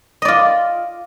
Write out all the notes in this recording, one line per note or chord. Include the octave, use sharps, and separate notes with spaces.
F4 D5 D#5